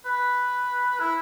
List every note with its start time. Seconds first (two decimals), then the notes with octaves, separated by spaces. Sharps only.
0.05 B4
1.00 E4